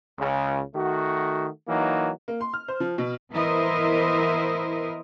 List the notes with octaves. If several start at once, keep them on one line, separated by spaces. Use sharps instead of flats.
C#2 C#3
D#3 A3 F#4
E3 F#3 A#3 D#4
A#3
C6
F6
C5
F3
B2
E3 B3 E4 A#4 C5 D#5